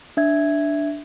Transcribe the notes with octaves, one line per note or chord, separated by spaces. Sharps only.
D4 E5 G#6